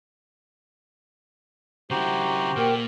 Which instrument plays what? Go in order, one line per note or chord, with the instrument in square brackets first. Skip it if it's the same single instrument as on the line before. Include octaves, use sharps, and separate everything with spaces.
[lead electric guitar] C#3 E4 [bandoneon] F#4 G4 C5 [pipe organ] A#5
[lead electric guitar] A#2 [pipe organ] A#4 G5